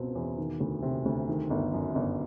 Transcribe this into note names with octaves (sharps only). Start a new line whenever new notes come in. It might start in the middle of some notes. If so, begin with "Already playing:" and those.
Already playing: C#2 B2 C4
E2
D#3
D2
C3
D2
D#3
G1
F#2
G1